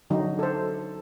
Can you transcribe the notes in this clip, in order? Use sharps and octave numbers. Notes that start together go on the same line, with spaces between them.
D3 F#3 D#4
A4 C5